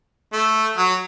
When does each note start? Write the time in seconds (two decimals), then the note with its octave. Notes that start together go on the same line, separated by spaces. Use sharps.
0.33 A3
0.78 F#3